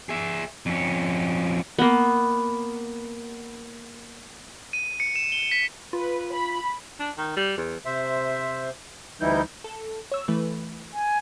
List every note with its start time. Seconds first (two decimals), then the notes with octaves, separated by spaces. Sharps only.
0.09 G#4 E5
0.66 F2 C#4
1.79 A#3 B3
4.73 D#7
5.00 C#7
5.16 E7
5.32 G7
5.51 B6
5.93 F4 B4
6.34 B5
7.00 D4
7.17 D#3
7.37 G3
7.57 E2
7.85 C3 C5 E5
9.21 D2 E3 G3 D#4 E4 G6
9.64 A4
10.12 C#5 E6
10.28 E3 A3 B4
10.94 G#5